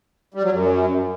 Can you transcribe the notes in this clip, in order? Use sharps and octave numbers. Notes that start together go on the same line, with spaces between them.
G3
F#3
F#2